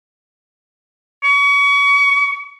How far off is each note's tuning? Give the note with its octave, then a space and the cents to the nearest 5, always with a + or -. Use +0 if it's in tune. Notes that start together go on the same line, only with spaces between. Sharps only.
C#6 +35